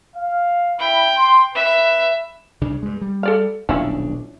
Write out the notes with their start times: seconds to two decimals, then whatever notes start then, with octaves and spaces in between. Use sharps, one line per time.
0.15 F5
0.79 E4 G5 B5
1.17 C6
1.55 B4 E5
2.61 C2 C#3 D4
2.83 G2 G#3
3.01 G3
3.23 A4 D5 F5
3.69 D#1 B1 F3 C#4 D4 E4